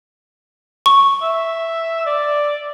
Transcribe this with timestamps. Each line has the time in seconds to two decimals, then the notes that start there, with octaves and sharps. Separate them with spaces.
0.86 C#6
1.22 E5
2.06 D5